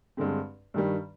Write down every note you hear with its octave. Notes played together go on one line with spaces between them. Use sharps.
G2 D3 G#3 C4
G2 D#3 G3